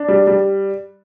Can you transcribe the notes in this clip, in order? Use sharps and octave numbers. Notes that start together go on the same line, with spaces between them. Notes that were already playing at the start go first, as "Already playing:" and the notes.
Already playing: D4
G3
G3